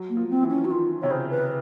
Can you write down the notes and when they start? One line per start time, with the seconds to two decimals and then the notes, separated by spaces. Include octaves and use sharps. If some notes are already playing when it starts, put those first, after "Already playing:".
Already playing: F#3
0.10 A#3
0.17 F3
0.30 C4
0.43 E3
0.50 C#4
0.65 F#4
0.70 D#3 F4
1.02 C3 C#5
1.11 C#3 C5
1.30 B4